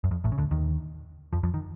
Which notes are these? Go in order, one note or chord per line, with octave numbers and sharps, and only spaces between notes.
F#2
F2
A1 A2
C#3
D2 D3
D#2 D#3
F2 F3
F2 F3
D#3